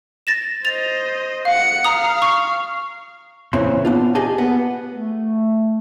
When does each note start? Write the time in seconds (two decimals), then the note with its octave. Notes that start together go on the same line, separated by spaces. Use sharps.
0.27 A6 A#6 E7
0.65 C5 D#5 A6 F7
1.45 F5 F#5 C#7
1.84 F5 A#5 D#6
2.22 C#6
3.53 A#2 C#3 E3 C4 C6
3.85 B3 D4 F4
4.15 G4 G#4 D#5 G#5 A5
4.38 B3
4.91 A3